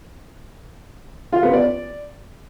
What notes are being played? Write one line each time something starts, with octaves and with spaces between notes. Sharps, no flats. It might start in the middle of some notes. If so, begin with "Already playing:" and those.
F4
B3
D5